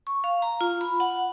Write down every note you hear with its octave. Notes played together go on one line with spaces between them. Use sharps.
C#6
F5
A#5
F4
B5
F#5